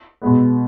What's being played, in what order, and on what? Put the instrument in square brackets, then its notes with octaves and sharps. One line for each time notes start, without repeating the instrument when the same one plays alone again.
[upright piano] B2 G#3 B3